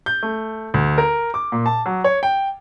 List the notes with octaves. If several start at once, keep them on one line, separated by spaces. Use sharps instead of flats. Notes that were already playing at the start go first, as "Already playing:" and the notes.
G6
A3
D2
A#4
D6
A#2
A5
F#3
C#5
G5